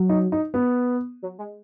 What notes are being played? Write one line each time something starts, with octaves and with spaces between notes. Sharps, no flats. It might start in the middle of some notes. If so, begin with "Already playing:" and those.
Already playing: F#3
D#4
D#4
B3
F#3
G#3